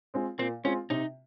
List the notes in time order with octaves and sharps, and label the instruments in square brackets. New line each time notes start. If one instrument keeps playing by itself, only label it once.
[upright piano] G#3 C4 F4
[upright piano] A#2 [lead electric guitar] C4
[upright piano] G#3 C4 F4 [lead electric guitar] C#4
[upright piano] C3 [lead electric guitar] D#4